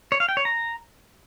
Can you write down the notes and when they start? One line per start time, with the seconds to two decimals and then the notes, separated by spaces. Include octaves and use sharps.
0.12 C#5
0.20 F5
0.29 G5
0.37 C#5
0.45 A#5